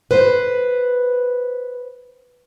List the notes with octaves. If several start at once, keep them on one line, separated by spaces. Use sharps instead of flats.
B4 C5